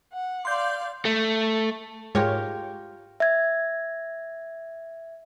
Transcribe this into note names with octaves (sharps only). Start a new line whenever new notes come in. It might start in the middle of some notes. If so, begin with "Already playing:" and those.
F#5
D5 F5 C6 G6
A3
G#2 G#3 F4 G4 A#4 C#5
E5 G#6